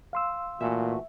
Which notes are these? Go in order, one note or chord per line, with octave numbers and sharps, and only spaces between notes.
F5 C6 E6
A#2 E3 A3 F#4 E5